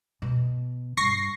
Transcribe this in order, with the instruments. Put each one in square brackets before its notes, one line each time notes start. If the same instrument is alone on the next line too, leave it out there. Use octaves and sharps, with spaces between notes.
[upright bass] B2
[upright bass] G2 [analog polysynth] C#6 A#6 C7